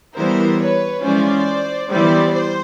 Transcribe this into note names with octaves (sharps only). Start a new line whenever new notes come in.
E3 G3 B3 E4 A#4 C5
B4 C#5
E3 G#3 C#4 F4 C5 D5
E3 G3 B3 E4 C5 D5
C5